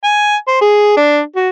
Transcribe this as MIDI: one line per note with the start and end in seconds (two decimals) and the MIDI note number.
0.04 0.36 80
0.48 0.61 72
0.61 0.93 68
0.97 1.20 62
1.36 1.50 66